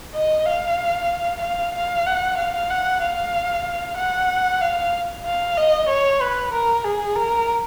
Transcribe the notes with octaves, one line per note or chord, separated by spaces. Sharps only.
D#5
F5
F5
F5
F#5
F5
F#5
F5
F#5
F5
F5
D#5
C#5
B4
A#4
G#4
A#4